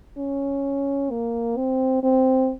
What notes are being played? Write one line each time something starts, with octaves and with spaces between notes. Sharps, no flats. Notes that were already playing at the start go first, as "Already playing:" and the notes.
C#4
A#3
C4
C4